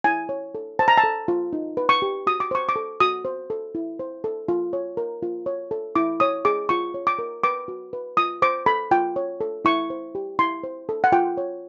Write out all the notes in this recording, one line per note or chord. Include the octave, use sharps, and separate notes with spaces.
E4 G#5
C#5
A4
C5 A5
A#5
A5
A4
F4
D#4
B4
C#6
G4
F#4 D#6
D6
C5 C#6
D6
A4
F#4 D#6
C5
A4
E4
C5
A4
F4
C#5
A#4
F4
C#5
A4
E4 D6
C#5 D#6
G#4 D6
F4 C#6
C#5
D6
A#4
B4 D6
F#4
B4
F4 D#6
C5 D6
A4 B5
F4 G5
C#5
A4
E4 C#6
C5
G4
E4 C6
C5
A4
F#5
F4 G5
C#5